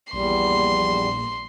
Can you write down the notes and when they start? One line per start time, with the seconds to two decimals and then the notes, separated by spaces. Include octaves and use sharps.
0.13 A#1 E2 G3 C6